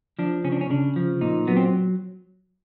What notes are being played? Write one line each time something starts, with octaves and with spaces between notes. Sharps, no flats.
F3 D4
C#3 C#4
D4
C#4
C#3 D4
F3
A#2 D#4
F#3 B3
C4